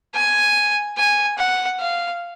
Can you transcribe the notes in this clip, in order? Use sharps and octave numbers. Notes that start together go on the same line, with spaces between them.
G#5
G#5
F#5
F5